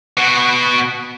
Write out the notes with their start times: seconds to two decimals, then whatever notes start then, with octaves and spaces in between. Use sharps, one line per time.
0.17 B2 F#4